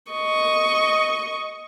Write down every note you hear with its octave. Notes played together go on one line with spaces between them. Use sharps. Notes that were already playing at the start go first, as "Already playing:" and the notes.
D#5 C#6